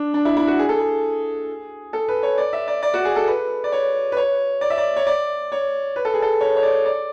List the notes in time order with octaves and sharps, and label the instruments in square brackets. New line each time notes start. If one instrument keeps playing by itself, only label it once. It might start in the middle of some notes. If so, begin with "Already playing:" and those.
Already playing: [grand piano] D4
D4
E4
E4
F#4
G#4
A4
G#4
A4
B4
C#5
D5
E5
D5
D5
F#4
G#4
A4
B4
D5
C#5
B4
C#5
D5
E5
D5
C#5
D5
C#5
B4
A4
G#4
A4
C#5
C#5
D5
D5